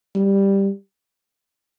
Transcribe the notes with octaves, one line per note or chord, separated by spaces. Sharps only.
G3